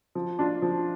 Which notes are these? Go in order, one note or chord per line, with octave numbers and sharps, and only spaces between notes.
F3
D4 F4
F3